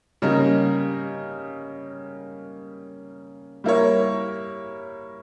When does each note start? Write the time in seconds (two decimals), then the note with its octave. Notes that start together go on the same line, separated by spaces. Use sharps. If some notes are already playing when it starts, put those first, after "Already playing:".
0.22 C#3 G3 A#3 D#4 A#4
3.64 G3 A#3 E4 A#4 C#5